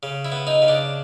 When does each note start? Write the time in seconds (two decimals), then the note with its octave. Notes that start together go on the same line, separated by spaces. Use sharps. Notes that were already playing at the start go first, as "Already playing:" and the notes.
0.03 C#3
0.25 E4
0.32 B3
0.47 D#4
0.62 C#3
0.68 D4